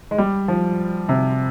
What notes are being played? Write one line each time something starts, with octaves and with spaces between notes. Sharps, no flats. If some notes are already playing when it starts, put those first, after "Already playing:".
G#3
G3
F3
C3